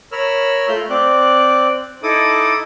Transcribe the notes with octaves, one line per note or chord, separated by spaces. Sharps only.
A#4 C#5 B5 E6 F6
A3 F4 G6
C4 D5 F#6
D#4 E4 A4 D6 D#6